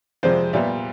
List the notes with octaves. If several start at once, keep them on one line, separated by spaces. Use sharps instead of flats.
F2 C3 F3 G#3 C5 D5
A#2 G3 B3 D5 E5